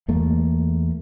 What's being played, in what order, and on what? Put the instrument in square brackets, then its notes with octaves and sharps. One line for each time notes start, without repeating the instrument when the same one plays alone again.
[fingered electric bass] E2 A3 A#3